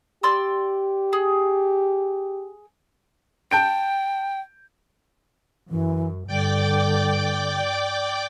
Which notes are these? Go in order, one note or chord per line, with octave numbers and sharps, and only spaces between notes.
G4 D5 C6 E6
G#4
G5 A5 G6 D7
F#2 E3
G2 D3 D5 G5 D6